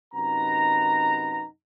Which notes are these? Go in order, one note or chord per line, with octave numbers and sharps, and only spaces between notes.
F#2 C3 D#4 B4 F#5 A#5